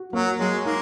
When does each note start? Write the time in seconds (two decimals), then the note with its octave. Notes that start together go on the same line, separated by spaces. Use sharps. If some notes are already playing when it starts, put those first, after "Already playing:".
Already playing: F#4
0.13 F#3 A#3
0.39 F#3 G#3
0.65 A#3 D#4